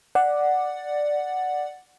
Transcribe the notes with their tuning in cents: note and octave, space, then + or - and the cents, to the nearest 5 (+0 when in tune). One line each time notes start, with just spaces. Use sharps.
D5 +5 F#5 +0